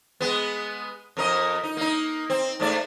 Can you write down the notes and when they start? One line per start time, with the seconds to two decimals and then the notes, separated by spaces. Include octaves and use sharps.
0.20 G#3 B3
1.17 F2 A#4 D#5
1.63 D#4
1.77 A#3 D#4
2.30 C4
2.60 G#2 A3 D5